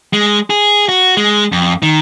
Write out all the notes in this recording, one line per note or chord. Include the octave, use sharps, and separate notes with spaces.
G#3
G#4
F#4
G#3
F2
D#3